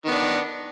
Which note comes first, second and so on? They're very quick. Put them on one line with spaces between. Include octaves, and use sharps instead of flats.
D#3 B3 D4